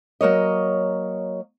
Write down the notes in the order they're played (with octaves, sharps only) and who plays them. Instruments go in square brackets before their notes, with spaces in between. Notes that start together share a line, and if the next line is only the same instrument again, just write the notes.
[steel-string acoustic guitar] F#3 A#3 C#5 D#5